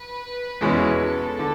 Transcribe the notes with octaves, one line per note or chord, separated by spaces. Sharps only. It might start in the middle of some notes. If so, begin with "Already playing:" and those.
Already playing: B4
E2 B2 G#3 C#4 E4
A4
D3